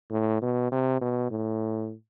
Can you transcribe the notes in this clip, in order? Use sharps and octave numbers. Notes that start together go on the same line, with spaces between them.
A2
B2
C3
B2
A2